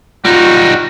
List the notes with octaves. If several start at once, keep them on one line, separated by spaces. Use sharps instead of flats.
G3 D#4 F4 F#4